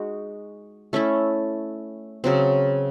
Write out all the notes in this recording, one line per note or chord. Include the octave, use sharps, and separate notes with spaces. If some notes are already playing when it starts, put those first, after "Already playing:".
Already playing: G#3 D#4 F#4
A3 C#4 E4 A4
C#3 F#3 C4